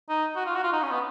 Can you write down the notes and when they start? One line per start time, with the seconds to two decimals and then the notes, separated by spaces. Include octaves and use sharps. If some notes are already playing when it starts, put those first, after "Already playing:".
0.09 D#4
0.36 F#4
0.46 F4
0.55 F#4
0.64 F4
0.73 D#4
0.82 C#4
0.91 B3